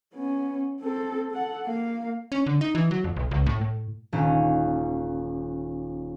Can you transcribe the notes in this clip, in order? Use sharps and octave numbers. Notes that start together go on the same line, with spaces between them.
B3 C#4
C4 A4
A4 F#5
A#3 F5
C#4
D3
D#4
E3
F#3
F2
B1
C#2
A2
A2
D#1 C#4